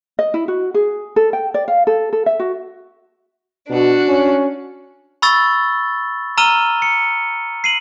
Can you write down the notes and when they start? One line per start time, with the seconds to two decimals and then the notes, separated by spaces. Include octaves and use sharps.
0.19 D#5
0.34 E4
0.48 F#4
0.74 G#4
1.16 A4
1.33 G5
1.54 D5
1.68 F5
1.87 A4
2.13 A4
2.26 E5
2.39 F#4
3.70 B2 D4 F#4
4.08 C#4
5.22 B5 C#6 E6 A6 G7
6.38 A#5 E6 F6 D#7 F7 G7
6.82 C#7
7.64 C7 D#7 F#7